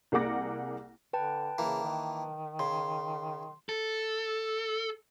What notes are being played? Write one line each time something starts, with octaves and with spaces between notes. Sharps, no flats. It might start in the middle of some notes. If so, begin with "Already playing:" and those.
C2 A#3 G#4 F#5 D6 A#6
D3 B4 G5 A5
C#3 E3 A#3
D#3
C#3 C6
A4